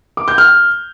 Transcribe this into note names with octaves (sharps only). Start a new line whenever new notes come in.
D6
G6
F6